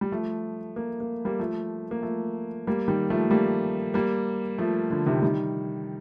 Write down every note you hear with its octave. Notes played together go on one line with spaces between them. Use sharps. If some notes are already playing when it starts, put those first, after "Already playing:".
G3
F3 A3
A#3
A#3
G3 A#3
F3 A3
A#3
F3 A3
G3 A#3
D#3 G3
F3 A3
G3 A#3
G3 A#3
F3 A3
D3 F3
C3 D#3
D#3 G3